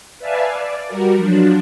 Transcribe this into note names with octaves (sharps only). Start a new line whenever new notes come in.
B4 D5 E5 F5 G#5 A5
D5
G3 F#4 A#4
F3 F#3 D4